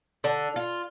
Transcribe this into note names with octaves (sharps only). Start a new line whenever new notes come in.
D3
F4